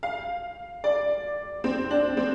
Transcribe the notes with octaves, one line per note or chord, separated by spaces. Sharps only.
F5
D5
C4
D4
C4